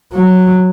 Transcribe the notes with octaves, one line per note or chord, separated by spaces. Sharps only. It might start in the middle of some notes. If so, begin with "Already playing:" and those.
F#3